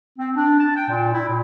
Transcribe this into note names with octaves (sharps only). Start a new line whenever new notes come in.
C4
D4
A5
G5
A#2
E4
A#2